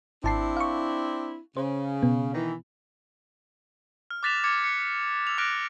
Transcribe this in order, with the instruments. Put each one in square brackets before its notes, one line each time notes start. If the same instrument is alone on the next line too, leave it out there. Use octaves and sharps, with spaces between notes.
[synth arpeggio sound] G#1 A5 C7 [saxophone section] C4 D4 E4
[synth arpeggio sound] F5 C#6
[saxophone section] C#3 [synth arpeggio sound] C5
[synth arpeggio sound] B2 B3
[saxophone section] D#3 E3
[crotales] F6
D6 F#6 A6 B6 E7 F7
D6 G#6 C#7
C#7
E6 F7
D6 F6 F#6 A#6 D7